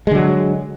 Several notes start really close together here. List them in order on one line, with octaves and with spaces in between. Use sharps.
G#3 D3 F#3